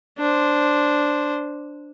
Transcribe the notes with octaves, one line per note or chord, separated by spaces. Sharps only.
D4 C5